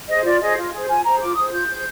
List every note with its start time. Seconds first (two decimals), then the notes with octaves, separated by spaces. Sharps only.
0.09 G#4 C5 D#5
0.25 F4 D5
0.41 G#4 C5 D#5
0.57 F4
0.72 G#4 C5
0.88 F4 G#5
1.04 G#4 C5 A#5
1.20 F4 D6
1.35 G#4 C5 D#6
1.52 F4 G6
1.67 G#4 C5